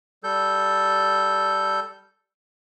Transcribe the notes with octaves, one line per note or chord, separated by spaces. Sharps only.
G3 A4 G6